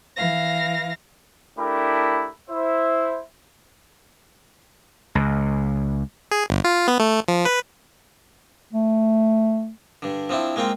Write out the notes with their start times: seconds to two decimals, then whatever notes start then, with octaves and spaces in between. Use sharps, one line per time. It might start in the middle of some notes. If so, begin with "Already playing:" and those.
0.16 E3 F5 A#6
1.58 A3 D4 E4 G4 A#4 B5
2.49 E4 C5 E5
5.15 C#2
6.31 G#4
6.50 G1
6.64 F4
6.88 B3
7.00 A3
7.28 F3
7.45 B4
8.73 A3
10.02 G2 D3
10.29 F3 C4 D4 E4
10.56 G#3 A#3 C4 F4 G5